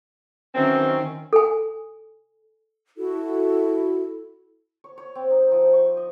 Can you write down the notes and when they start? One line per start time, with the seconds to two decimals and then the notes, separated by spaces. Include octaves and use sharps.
0.55 F#2 D#3 E3 C4 C#4
1.33 A4 G#5
2.97 E4 F#4 A4
4.84 C#5
4.98 C#5
5.15 C4
5.30 D#4
5.51 F3
5.73 C#6
5.97 D#5